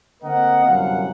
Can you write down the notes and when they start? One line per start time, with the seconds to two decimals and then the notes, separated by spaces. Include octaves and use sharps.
0.23 D3 A#3 C4 A#4 D#5 F#5
0.64 G1 C2 F#2 F5 F#5